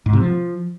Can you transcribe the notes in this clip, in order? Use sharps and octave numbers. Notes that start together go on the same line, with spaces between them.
G#2
C3
F3